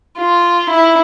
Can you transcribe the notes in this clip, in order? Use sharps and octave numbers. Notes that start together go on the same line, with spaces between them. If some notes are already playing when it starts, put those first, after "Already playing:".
F4
E4